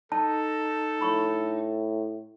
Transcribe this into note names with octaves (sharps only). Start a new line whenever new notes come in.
D#4 A4 A5
A2 B5 C#6